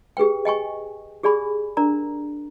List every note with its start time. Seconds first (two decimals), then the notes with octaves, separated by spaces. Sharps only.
0.17 G4 G#4 B4 G5
0.45 D#5 G5 G#5 C#6
1.23 G4 G#4 D5 G#5 B5
1.77 D4 A#4 D5 A#5